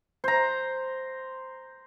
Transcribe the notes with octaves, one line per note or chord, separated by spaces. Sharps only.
C5 A#5